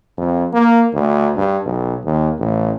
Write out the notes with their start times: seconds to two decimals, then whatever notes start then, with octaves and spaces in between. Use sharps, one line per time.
0.18 F2
0.54 A#3
0.93 D2
1.37 G2
1.66 B1
2.05 D#2
2.39 A1